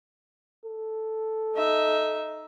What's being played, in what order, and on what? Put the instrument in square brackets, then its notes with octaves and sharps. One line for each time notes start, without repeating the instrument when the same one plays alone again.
[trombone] A4
[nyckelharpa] D#4 E5